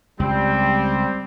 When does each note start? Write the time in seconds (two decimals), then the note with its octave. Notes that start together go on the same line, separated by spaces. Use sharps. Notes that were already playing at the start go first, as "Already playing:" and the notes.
0.20 C#2 G3 C4